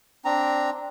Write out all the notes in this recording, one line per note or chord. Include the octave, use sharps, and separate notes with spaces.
C4 D4 A#5